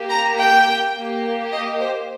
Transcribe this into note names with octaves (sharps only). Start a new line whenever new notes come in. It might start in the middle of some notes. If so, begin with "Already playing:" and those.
Already playing: A#3 G4
A#5
G5
A#3 G4
D#5
C5